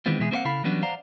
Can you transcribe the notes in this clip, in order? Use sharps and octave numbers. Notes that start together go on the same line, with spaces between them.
D#3 E3 G#3 B3 C4 F4
B2 E3 G#3 E4 G4 G#4
A#3 C4 F4 C5 F5 F#5
C#3 E4 A4 F5 B5
E3 F#3 G3 B3 C#4 D4
C5 D5 F5 F#5 A#5